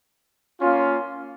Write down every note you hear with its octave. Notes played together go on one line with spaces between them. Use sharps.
A#3 C#4 F4